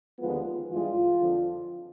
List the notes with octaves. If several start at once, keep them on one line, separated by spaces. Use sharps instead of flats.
D#2 D3 F3 G#3 B3 F4
G2 E3 G#3 F4
F2 D3 F3